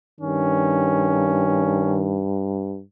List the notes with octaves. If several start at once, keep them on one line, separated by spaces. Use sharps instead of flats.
G2 D#3 C#4